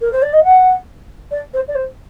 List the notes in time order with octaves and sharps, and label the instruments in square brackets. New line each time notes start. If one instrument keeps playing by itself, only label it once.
[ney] A#4
C5
D5
D#5
F#5
D5
C5
D5
C5